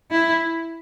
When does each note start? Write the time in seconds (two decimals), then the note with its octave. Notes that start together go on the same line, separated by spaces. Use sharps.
0.11 E4